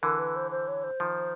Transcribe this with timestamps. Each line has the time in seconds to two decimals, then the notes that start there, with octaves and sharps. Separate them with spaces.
0.03 D3 E3 A#4
0.19 B4
0.36 C5
0.51 C5
0.68 C#5
0.84 C5
1.00 D#3 F3